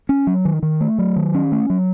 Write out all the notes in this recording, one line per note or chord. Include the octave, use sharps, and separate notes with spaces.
C#4
F#3
D#3
D#3
A3
F#3
D#3
C#4
A3
F#3